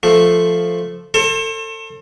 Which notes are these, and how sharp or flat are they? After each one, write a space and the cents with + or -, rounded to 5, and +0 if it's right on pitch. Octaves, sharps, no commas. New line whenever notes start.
F3 +0 A3 +0
A4 +30 C5 +40